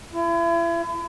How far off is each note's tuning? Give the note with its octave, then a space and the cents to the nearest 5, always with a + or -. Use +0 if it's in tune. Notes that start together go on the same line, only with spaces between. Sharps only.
E4 +40